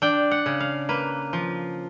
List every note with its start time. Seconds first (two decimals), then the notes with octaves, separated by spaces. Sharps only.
0.02 D4 G5
0.31 F#5
0.46 C#3
0.60 F5
0.89 A#3 B4
1.33 F3